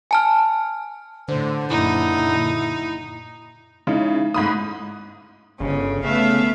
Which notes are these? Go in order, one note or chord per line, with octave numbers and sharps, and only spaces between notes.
G#5 A5 F6
A2 D3 C5
F#1 A#2 D#4 E4
C#3 G#3 D#4 E4
G#2 A3 B5 D#6
G1 C#3
C#3 A3 B3 E5 F5